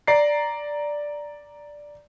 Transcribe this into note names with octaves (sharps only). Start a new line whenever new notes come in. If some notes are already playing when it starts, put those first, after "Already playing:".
D5 A#5 C7